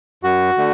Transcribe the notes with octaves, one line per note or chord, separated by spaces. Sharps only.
F#2 F#4
D3 A3